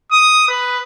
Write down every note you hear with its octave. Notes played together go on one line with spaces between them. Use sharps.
D#6
B4